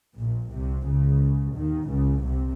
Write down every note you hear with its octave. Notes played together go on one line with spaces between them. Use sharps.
A#1 A#2
C2 C3
C#2 C#3
D#2 D#3
C#2 C#3
C2 C3